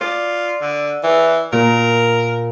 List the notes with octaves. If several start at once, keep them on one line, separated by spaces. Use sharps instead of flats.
F4 D5
D3
E3
A#2 A#4